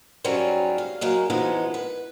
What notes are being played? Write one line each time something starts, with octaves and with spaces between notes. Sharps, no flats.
G#2 F#3 G3 C4 C#4 F4
F5
F#3 G#3 A#3
E3 F3 G#3 B3 D#4 E4
B4